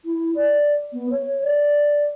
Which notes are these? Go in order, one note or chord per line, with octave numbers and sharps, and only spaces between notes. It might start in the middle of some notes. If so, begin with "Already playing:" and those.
E4
D5
B3
C#5
D5